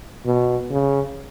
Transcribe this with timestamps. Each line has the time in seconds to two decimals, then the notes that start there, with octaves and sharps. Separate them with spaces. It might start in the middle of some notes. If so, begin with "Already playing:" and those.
0.26 B2
0.71 C#3